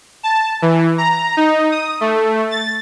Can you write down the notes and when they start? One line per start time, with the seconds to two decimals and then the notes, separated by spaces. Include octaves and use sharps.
0.23 A5
0.62 E3
0.98 A#5
1.37 D#4
1.71 D#6
2.01 A3
2.51 A6